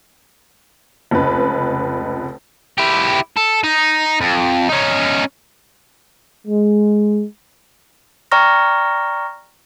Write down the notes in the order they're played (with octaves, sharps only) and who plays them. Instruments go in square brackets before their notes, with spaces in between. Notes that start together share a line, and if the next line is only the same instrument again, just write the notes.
[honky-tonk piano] F1 C#2 B4
[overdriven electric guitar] E4 G4
A4
D#4
F2
C#4 D#4
[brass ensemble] G#3
[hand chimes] D5 G5 A#5 C#6 F6 A#6